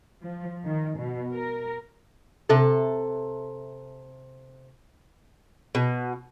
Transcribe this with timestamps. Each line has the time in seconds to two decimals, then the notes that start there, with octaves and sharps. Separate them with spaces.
0.22 F3
0.65 D#3
0.98 B2
1.33 A#4
2.49 C3 A4
5.75 B2